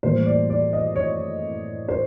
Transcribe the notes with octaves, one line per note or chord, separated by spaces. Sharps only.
A2 E3 G3 A#3 C5
D5
D5
D#5
C#5
C5